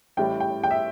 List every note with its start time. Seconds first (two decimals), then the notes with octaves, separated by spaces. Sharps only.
0.17 A1 A2 G3 G5
0.40 G5
0.63 G5
0.71 E5